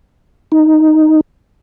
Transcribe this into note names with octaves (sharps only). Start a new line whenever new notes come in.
D#4